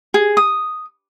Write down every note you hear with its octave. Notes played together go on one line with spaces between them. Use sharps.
G#4
D#6